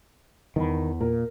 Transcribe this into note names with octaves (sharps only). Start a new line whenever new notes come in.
E2 D#3 B5
A#2 A#4